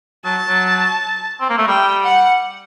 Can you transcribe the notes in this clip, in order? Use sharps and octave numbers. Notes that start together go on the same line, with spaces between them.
F#3 A5
F#3
C4
A#3
A3
G3 G5
F#5